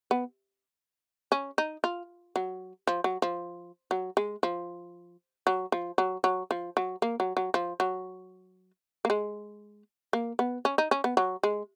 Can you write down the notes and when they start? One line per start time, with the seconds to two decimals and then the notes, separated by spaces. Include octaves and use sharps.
0.11 B3
1.32 C#4
1.58 D#4
1.84 F4
2.36 F#3
2.87 F3
3.04 F#3
3.22 F3
3.91 F#3
4.17 G#3
4.43 F3
5.47 F#3
5.72 F3
5.98 F#3
6.24 F#3
6.51 F3
6.77 F#3
7.02 A#3
7.20 F#3
7.37 F#3
7.54 F3
7.80 F#3
9.05 A#3
9.10 G#3
10.13 A#3
10.39 B3
10.65 C#4
10.78 D#4
10.91 C#4
11.04 B3
11.17 F#3
11.43 G#3